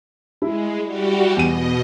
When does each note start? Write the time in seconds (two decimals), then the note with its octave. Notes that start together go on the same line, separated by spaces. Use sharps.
0.42 G#3 E4
0.83 G3 F#4 G4
1.36 E2 B2 D#5 D#7